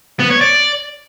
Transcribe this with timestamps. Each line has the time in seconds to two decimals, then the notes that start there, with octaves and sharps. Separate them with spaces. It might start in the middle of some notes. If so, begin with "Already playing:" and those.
0.20 B3
0.30 C#5
0.41 D5